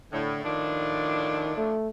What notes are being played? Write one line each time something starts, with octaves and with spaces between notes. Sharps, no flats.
A2 D3
A2 D#3 F3 D4
A3